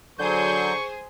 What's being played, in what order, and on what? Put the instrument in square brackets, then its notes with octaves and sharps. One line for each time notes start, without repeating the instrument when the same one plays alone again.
[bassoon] D3 [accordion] F#3 G6 [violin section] G#4 C5 [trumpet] C#6